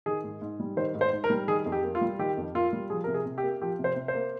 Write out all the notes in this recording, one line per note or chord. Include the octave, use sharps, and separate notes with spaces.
D#3 G#4
G#2
G#2
G3
D#3 C5
G#2
C5
G#2
A#4
G3
D#3 G#4
F2
G4
A#3
F4
G3
D#3 G4
F2
A#3 F4
G3
F3 G#4
C3 A#4
G#4
C3
G4
A#3
F3 G4
C3
C5
C3
C5
A#3